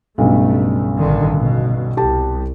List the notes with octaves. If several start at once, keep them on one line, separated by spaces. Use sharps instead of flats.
B1 G2 C#3 A3
A1 D3 D#3
B2
C2 G4 A5